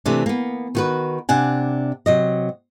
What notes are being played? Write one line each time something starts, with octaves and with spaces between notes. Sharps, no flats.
C3 E3 A3 D4
A#3 B3
D#3 F#4 B4
C3 D4 F#5 G#5
C3 F#3 D#5